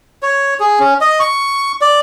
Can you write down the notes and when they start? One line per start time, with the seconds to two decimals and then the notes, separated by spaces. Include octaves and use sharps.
0.23 C#5
0.60 G#4
0.79 C#4
1.01 D#5
1.20 C#6
1.81 D5